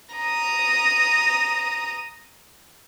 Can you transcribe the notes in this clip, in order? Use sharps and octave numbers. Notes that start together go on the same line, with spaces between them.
A#5 D#6